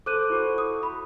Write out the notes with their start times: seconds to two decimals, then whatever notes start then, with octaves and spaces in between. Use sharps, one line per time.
0.06 A4 C5 D6 F#6 D#7
0.30 E4 F#4 A4
0.58 D#6
0.83 B5